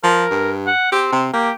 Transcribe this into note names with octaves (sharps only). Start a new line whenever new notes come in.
F3 A#4
G2
F#5
C4 G4
C3
A#3 G4